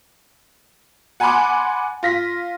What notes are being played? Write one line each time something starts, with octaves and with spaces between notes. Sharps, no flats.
F#5 G#5 A5 B5 C6 D6
F4 A#6 B6